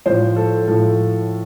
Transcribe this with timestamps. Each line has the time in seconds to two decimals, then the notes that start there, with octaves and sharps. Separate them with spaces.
0.06 A2 F3 C5
0.36 A4
0.67 A2 F3 A4